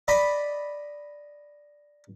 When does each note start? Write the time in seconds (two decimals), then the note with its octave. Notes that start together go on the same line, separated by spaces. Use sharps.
0.08 D5 D#5 B5